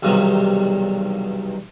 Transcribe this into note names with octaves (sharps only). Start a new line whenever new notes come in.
B1 E2 G2 C3 D#3 F#3